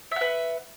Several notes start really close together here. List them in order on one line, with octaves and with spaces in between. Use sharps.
E5 F#5 B4